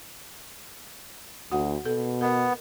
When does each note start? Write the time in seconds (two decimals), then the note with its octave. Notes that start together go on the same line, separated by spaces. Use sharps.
1.52 D2 F#4 F#5
1.85 B2 A4
2.21 B3 A#4 D#5